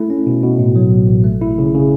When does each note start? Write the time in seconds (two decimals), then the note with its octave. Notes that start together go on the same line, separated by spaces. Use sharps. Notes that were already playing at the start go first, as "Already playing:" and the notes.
Already playing: A3 E4
0.10 C#4
0.27 B2
0.43 B2
0.59 A2
0.76 F#3
0.91 A1
1.08 A1
1.24 A3
1.42 E4
1.58 C#3
1.75 C#3